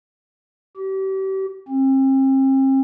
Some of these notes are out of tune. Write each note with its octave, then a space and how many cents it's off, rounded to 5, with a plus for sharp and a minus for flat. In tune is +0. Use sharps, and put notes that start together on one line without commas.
G4 -35
C4 +40